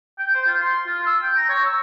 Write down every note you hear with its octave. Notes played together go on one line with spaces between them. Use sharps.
G5
C5
F4
C6
F4
E6
G5
A#5
C#5
E6